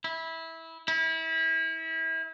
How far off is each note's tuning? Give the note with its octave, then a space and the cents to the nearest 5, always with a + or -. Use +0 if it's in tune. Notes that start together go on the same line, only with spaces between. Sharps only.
E4 -15
E4 -30